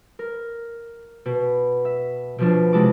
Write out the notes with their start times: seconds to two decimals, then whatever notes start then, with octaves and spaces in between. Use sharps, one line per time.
0.19 A#4
1.25 B2
1.85 E5
2.38 B2 F3 D4
2.73 C3 G#3 E4 A5 D6